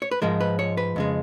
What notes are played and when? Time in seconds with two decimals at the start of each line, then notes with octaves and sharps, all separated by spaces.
0.02 C#5
0.11 B4
0.22 G#2 F3 G#3 A#4
0.41 B4
0.59 C#5
0.77 B4
0.96 F2 C#3 G#3